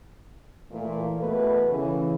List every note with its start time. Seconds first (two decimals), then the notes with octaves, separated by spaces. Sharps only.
0.72 A#2 E3 A3
1.20 E2 B2 A3 B4
1.70 C#3 E3